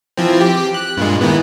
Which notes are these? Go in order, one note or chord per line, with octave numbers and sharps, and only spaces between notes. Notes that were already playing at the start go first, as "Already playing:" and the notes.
E3 F3 C4
G4
F#6
G2 A#2 G#3
D#3 E3 B3